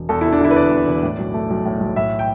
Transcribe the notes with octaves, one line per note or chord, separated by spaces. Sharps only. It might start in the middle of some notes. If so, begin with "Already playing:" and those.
Already playing: E1
E2 A4
E4
E1
D4
D3 E4
B4
E1 D5
E2
E1
A2
B1
A3
B1
A2
B1
A2 E5
G5